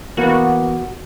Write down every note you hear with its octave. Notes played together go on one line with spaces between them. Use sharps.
E3 A#3 B3 F#4